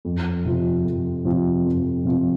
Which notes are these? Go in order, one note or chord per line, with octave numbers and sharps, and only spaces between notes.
F2
C3 F3 C4 F4
F2
C3 F3 C4 F4
F2
C3 F3 C4 F4